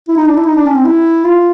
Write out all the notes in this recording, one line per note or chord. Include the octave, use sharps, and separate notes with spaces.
E4
D#4
D4
E4
D#4
D4
C#4
C4
E4
F4